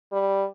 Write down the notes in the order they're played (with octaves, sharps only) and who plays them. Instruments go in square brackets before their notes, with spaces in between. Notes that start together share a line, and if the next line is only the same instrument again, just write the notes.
[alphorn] G3